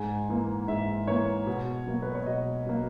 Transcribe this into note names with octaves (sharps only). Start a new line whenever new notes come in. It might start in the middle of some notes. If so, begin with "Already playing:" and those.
Already playing: G#2 G#5
E3 A#3
G#2 E5
E3 A#3 C#5
B2
F#3 A#3
B4
C#5
B2 D#5
F#3 A#3